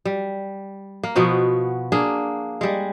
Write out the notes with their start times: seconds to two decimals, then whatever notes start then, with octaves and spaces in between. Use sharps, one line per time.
0.05 G3
1.03 A#3
1.16 B2 F3 B3 F#4
1.92 A#3 D4 G#4
2.61 G3 G#3